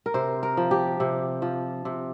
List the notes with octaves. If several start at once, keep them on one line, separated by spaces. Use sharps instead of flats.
A#4
C3 C5
A#4
F3
G4
C3
F3
C3